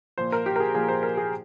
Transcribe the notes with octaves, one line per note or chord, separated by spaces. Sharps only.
A#2 F3 C5
A#4
G4
A#4
G#4
A#2 F3 G#4
C5
A#4
G#4